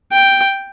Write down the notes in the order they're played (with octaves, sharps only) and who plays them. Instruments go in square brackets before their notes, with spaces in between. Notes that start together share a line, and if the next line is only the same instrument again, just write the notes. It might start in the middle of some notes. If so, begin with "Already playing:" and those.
[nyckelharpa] G5